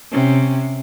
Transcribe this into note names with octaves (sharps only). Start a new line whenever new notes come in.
C3 C#4